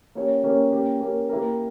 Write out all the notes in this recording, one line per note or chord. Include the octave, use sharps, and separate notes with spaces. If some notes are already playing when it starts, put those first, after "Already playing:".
A#3 C#4 G4 C#5
A#3 C#4 G4 C#5
A#3 C#4 G4 A#4
A#3 C#4 G4 A#4
A#3 E4 G4 A#4